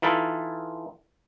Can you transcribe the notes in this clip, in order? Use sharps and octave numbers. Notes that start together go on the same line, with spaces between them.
E3 D#4 F4 A4 B4